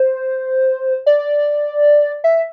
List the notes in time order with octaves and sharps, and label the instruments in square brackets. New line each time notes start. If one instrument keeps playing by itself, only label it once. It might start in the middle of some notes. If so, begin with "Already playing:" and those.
Already playing: [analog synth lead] C5
D5
E5